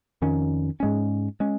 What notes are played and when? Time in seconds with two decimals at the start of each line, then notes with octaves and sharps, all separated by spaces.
0.22 F2 D#3 C#4
0.80 G#2 G#3 C#4
1.40 G#3 C#4